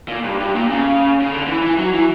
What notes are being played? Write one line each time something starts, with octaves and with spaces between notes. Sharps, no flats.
A#2
G2
G2
A#2
C#3
C#3
D3
E3
E3
F#3
E3